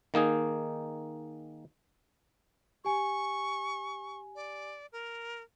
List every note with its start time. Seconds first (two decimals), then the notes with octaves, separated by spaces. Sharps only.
0.14 D#3 A#3 D#4 G#4
2.85 G4 G#5 C#6
4.35 D5
4.92 A#4